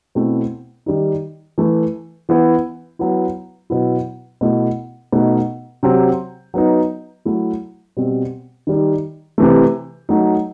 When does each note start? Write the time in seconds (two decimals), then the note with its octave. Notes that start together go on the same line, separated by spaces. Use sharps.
0.15 B2 A3 C4 E4
0.86 D#3 G3 D#4
1.58 E3 A3 E4
2.29 E3 B3 E4
2.99 F#3 B3 E4
3.70 B2 F#3 B3 E4
4.41 B2 A3 E4
5.12 B2 A3 D#4
5.83 C3 F#3 C4
6.54 F#3 B3 D#4
7.25 F#3 A3 E4
7.97 B2 G3 C4
8.67 D#3 G3 D#4
9.38 C3 E3 A3
10.09 F#3 A3 D#4